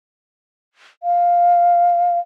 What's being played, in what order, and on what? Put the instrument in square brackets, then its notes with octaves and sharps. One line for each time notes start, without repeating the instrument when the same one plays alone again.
[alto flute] F5